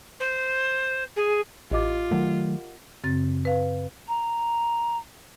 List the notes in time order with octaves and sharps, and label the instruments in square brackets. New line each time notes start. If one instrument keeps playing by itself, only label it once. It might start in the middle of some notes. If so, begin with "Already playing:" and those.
[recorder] C5
G#4
[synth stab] A1 [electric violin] F4 [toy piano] G4 D#5 D6
[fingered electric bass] D#3 F#3 A3 [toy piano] A#4 F#5
[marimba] F#2 C#3 C4 A6
B4 F5
[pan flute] A#5